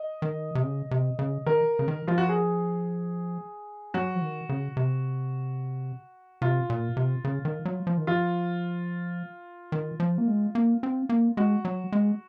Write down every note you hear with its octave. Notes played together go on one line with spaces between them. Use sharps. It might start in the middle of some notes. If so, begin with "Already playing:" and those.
Already playing: D#5
D#3
C3
C#3
C3
C#3
D#3 A#4
C#3
D#3
F3 F4
F#4
G#4
F#3 F#4
F3
D#3
C#3
C3
C3 F4
A#2
C3
C#3
D#3
F#3
F3
D#3
F3 F4
D#3
F3
A#3
G#3
A#3
C4
A#3
G#3 F#4
F#3
G#3